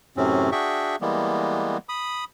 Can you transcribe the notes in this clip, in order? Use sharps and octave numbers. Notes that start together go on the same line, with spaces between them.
F#2 A2 C3 C4 C#4
D4 F#4 G#4 E5 G5 C#6
E3 G3 G#3 A#3 B3
B5 D#6